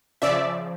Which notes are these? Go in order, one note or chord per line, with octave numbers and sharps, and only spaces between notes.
C#3 F3 D5 E5